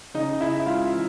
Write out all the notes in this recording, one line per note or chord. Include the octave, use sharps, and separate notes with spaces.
C#3 D#4 D#5
C#3 E4 E5
G#3 F4 F5
E3